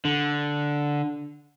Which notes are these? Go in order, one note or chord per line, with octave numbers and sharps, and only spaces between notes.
D3